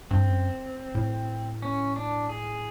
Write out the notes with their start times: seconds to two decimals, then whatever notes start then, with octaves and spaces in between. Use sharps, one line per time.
0.11 G2 C4
0.27 F#2
0.95 A2
1.62 C#4
1.96 D4
2.29 G#4